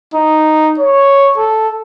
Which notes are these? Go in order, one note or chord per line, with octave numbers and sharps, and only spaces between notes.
D#4
C#5
A4